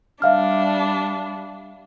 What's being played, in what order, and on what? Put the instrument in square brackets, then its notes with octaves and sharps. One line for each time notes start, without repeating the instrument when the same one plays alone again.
[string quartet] G3 D4 [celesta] E5 F5 F6